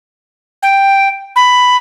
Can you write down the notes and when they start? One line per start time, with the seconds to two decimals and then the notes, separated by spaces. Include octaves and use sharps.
0.63 G5
1.36 B5